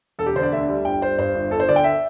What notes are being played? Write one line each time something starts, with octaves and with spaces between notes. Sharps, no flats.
E1 A4
G4
D3 C5
D5
D2 E5
G3
G1 G5
G3 C5
G2 C5
G1
G1 A4
C5
D3 D5
G5
E5